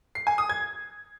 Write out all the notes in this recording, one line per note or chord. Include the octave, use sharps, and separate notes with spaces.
C7
G#5
D#6
G#6